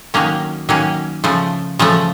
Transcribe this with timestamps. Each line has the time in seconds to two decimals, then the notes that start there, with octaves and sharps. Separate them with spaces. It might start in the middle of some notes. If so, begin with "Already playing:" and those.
0.14 D#3 F#3 A#3 C#4
0.69 D#3 F#3 A#3 C#4
1.24 C#3 F3 A3
1.79 C#3 F3 A3